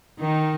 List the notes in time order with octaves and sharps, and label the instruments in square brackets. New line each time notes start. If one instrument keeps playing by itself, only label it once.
[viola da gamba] D#3 D#4